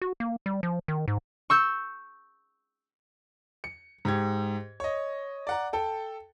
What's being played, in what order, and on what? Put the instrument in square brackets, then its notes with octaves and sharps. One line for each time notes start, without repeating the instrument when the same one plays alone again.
[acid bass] F#4
A#3
G3
F3
D#3
G#2
[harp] C#6 E6 G6
[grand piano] C#7
G#2 G4 G#6
C#5 D#5
D5 F#5 A#5
A4 G5